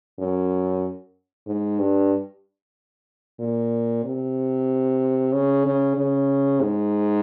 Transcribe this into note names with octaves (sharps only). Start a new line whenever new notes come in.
F#2
G#2
G2
A#2
C3
C#3
C#3
C#3
G#2